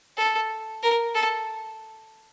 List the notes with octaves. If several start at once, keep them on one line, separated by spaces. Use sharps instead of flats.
A4
A#4
A4